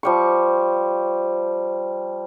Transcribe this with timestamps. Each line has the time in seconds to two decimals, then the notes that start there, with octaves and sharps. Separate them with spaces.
0.03 F3 G3 C#6